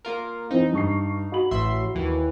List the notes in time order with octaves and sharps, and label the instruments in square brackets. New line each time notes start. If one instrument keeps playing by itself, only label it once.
[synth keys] A#3 F4 A#4
[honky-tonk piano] E3 C4 [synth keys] D#4
[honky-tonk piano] G2 C#6 C7
F#4 B5 F#7
[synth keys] A1 E5 C6
D#2 E3